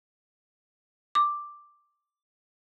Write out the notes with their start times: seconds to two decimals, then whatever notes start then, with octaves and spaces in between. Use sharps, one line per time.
1.15 D6